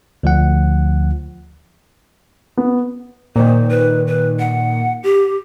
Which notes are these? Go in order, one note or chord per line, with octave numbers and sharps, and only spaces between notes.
D2 F3 F#5
B3
A#2 D#3 C5
B4
B4
F#5
G4